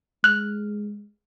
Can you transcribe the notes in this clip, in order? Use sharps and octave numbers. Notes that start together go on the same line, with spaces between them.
G#3 F6 F#6